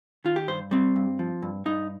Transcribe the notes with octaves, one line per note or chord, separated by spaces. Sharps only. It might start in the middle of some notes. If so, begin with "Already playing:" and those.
D#3 F4
G4
G2 C5
G3 C4
G2
F3
G2
G2 D#4